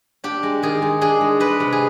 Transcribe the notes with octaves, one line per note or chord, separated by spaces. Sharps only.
D4 G4
G#3
D#3 G#4
G#3
D4 G#4
G#3
G#3 B4
C3
G#4